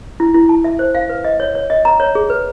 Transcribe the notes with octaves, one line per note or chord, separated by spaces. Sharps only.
E4
E4
A5
E5
C5
F5
B4
D#5
C#5
C#5
D#5
A#5
C#5
G#4
B4